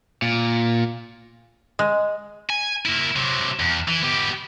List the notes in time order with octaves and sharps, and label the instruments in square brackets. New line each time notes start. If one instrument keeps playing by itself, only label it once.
[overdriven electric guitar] A#2
[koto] G#3
[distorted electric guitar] G#5
A#3 E4
C3 F#3
E2
E3
B3 G4